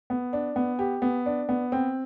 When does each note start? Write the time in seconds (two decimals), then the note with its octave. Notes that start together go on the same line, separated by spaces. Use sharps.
0.10 B3
0.33 D4
0.56 B3
0.79 G4
1.02 B3
1.26 D4
1.49 B3
1.72 C4